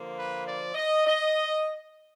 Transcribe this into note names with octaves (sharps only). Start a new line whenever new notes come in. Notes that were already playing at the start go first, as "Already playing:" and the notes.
Already playing: D3 F3 A#3
B4
D5
D#5
D#5